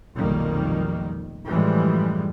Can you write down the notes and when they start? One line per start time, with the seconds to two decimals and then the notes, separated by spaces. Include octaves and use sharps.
0.15 F1 B1 F2 D#3 G3 A#3
1.49 F#2 A2 E3 F3 G3 G#3